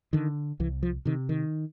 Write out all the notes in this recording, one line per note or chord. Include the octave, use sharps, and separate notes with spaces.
D3 D#3
C2 E3
F3
C3 D#3
D#3